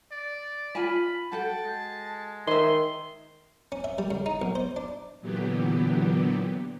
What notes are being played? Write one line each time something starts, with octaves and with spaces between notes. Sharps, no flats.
D5
F4 G#5 A5 B5
F#4 A4 F#5 G5 A5
G#3
D#3 D#5 E5 C6
C#4
E5
G3
C#3
D#4
B1
C5
D4
A#2 D3 E3 F#3 B3 G4